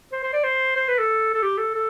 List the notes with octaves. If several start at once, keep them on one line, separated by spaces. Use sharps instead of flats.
C5
C5
D5
C5
C5
B4
A4
A4
G4
A4
A4